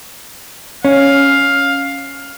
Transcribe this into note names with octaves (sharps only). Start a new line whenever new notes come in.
C#4 F5